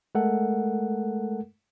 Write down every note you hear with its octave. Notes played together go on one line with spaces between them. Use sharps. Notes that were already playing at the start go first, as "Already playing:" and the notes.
G#3 A3 A4 A#4 F#5